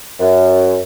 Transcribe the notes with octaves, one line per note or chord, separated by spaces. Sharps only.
F#2